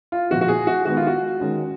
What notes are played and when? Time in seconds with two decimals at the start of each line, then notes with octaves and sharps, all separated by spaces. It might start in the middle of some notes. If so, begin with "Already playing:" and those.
0.12 F4
0.30 A#2 F3 B3 F#4
0.41 F#4
0.48 G#4
0.67 F#4
0.85 D#3 G#3 B3 F#4
0.97 F4
1.07 F#4
1.40 D#3 G#3 C#4